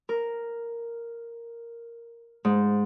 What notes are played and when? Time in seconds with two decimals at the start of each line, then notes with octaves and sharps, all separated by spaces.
0.09 A#4
2.45 G#2